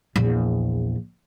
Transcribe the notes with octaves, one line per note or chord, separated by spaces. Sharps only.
A#1 E2